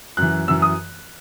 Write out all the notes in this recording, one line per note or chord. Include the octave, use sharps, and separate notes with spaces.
F#2 E3 F#6
F#2 E3 E6
D#6